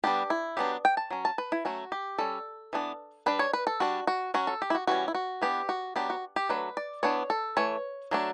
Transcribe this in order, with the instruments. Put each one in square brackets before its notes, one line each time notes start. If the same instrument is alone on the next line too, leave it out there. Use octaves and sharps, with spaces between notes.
[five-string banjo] G3 B3 D4 G4
E4
F#3 B3 D4 G4
G5
A5
F#3 C#4
A5
B4
E4
F#3 A3 C#4 F#4
G4
G3 C#4 A4
E3 B3 D4
G3 D4 B4
C#5
B4
A4
G3 D4 F#4
F#4
F#3 C#4 F#4
A4
G4
E4
F#4
E3 G3 C#4 F#4
E4
F#4
E3 B3 D4 G4
F#4
F#3 B3 D4 G4
F#4
G4
F#3 A3 D4 B4
D5
E3 B3 D4 C#5
A4
E3 A3 C#5
F#3 A3 D4